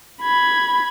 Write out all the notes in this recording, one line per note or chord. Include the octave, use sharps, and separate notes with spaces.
B5 G#6